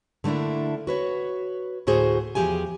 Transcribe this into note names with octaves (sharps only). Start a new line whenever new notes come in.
D3 A3 A#3 D4 E4
F#4 B4 C#5
D2 A2 F#4 G#4 C5
E2 D#3 F3 G4 G#4 G#5